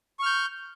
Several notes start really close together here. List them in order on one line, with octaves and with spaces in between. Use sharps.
C#6 F6 G6